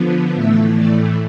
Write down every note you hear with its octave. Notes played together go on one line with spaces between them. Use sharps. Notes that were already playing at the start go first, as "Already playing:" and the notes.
Already playing: D3 F3 B3
A2 E3 A3 E5
D5